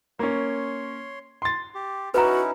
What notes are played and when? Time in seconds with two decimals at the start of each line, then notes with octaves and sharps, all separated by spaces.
0.19 A#3 C#4 C#5 C6
1.42 C6 A6
1.75 G4
2.14 C#4 D#4 E4 F#4 B4 A#5